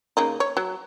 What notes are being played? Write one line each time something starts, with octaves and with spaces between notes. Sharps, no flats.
C#3 A#3 D#4
C#5
F#3